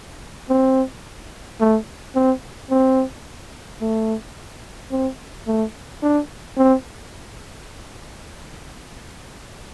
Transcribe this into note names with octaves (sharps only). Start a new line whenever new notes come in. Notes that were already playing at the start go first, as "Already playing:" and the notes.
C4
A3
C4
C4
A3
C4
A3
D4
C4